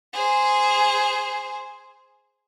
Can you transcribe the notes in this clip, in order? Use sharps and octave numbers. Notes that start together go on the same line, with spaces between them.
G#4 C5